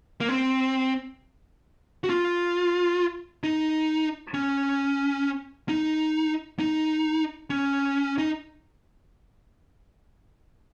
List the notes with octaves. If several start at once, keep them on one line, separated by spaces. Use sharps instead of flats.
A#3
C4
F#4
F4
D#4
C#4
D#4
D#4
C#4
D#4